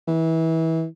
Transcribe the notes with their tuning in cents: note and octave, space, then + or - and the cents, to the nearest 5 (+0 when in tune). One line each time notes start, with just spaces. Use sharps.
E3 -25